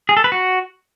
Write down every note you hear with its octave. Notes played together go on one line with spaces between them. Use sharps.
G#4
A4
B4
F#4